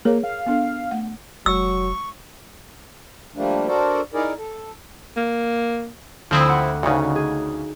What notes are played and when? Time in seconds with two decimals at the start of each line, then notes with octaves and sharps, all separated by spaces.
0.05 A#3 G#4 A#4 C#5
0.24 F5
0.46 B3 D4 A4
0.91 A3 F#5
1.46 F1 F#3 C#6 E6
3.35 F3 G3 A3 A#3 D4
3.67 D4 F#4 A4 A#4 C5 D5
4.14 D#4 E4 G#4 A#4 D5
4.38 A4
5.16 A#3
6.31 D2 F3 C4 E4 D#6
6.49 F#5
6.83 D2 C#3 D#4 F#4
7.16 G#4